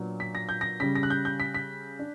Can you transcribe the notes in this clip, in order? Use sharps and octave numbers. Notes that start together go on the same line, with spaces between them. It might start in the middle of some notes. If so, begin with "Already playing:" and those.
Already playing: A#2 F#3 B3 D4
B6
A#6
G6
A#6
C#3 G3 C#4 B6
A#6
F#6
G6
G6
B6
B6
D4